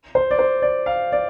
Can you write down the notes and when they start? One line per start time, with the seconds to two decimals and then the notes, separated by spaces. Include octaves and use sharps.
0.15 C5
0.31 D5
0.39 C5
0.62 D5
0.86 F5
1.12 D5